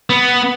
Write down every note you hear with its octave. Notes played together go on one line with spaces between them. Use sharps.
B3